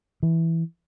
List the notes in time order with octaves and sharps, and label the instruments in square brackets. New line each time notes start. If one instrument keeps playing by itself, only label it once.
[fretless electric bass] E3